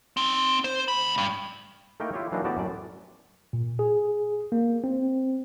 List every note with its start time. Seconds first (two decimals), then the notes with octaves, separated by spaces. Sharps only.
0.17 C4 D#4
0.64 C5
0.88 D2 B5
1.18 G2
2.00 A3 A#3 D#4 E4 A#4 G5
2.13 E4 F4 G4 C#5
2.32 E3 F#3 A#3 D4 D#4
2.44 A2 B3 F#4 G4 D5 A5
2.57 F#2 A2 D5
3.53 A#2
3.79 G#4
4.52 A#3
4.84 C4